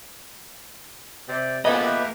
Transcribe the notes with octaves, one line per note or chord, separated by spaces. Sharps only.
C3 D5 G5
A#3 B3 F4 G4 A4 D#5 G#5 B5
G4 B4 E5